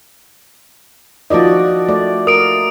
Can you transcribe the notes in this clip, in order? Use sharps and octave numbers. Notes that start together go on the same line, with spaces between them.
D#3 F3 F#4 D5 D#5
A3 D5
A#4 D#6 D7